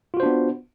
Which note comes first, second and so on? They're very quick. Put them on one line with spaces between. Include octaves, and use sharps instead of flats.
F4 F#4 C5 D4 B3